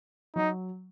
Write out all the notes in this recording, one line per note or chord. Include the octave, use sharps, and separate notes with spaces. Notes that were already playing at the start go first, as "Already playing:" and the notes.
F#3 D#4